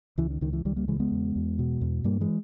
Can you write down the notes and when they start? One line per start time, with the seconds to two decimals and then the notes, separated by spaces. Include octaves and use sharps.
0.18 C#2 E3
0.30 D#3
0.41 C#2 D#3
0.53 E3
0.65 C#2 D#3 G3
0.76 G3 A#3
0.88 C#3 E3 G#3
1.00 G#3 B3
1.12 E2
1.36 E2
1.59 B2
1.81 E2
2.04 G2 G3 A#3
2.21 E3 G#3